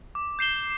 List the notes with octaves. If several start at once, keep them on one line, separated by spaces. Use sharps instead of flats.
D6
G6 C7 E7 G7